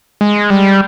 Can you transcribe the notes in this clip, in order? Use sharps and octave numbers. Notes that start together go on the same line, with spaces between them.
G#3
G3